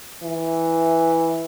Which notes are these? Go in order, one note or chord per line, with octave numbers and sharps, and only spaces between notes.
E3